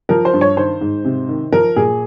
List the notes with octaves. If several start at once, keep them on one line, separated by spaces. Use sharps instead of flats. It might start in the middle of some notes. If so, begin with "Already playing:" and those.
F3 A#4
C5
G2
C#5
D#3 C5
G#2
C3
D#3
F3 A#4
A#2 G#4